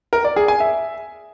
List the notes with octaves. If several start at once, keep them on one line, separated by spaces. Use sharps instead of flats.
A#4
D5
G#4
G#5
E5